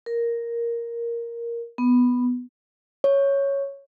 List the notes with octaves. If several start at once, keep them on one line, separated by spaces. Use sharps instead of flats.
A#4
B3
C#5